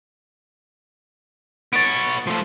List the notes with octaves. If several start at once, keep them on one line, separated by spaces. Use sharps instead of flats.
B3 C#5 A6 D7
F3 A3